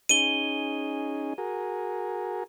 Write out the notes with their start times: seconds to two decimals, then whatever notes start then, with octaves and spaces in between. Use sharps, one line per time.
0.09 C#4 D#4 G#4 D#7 G7
1.38 F#4 G#4 A#4